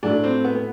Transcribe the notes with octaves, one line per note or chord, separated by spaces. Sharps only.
A2 F#3 A3 D4
C4
B3
B3